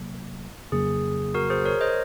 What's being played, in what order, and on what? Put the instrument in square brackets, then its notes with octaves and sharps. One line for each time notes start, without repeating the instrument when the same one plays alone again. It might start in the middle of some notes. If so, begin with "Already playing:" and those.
Already playing: [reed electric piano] C3 F#3 A#3
[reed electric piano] F2 C#3 F#3 A#3 [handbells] G#4
[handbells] F#4 A#4
G#4 C5
A#4 C#5
C5 D#5